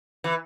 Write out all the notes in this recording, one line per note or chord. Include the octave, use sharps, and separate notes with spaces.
E3